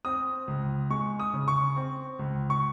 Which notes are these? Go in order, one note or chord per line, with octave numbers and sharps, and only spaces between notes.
C4 D#6
C#2
G#3 C#6
D#6
C#3
C#6
C4
C#2
C#6